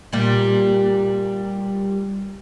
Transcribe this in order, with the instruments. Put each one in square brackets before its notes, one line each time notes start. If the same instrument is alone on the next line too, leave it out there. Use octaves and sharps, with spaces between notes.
[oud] A#2 G3